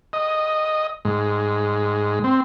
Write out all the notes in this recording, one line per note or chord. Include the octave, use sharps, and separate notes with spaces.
D#5
G#2
C4